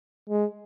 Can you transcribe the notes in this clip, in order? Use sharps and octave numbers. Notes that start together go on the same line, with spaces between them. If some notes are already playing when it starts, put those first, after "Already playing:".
G#3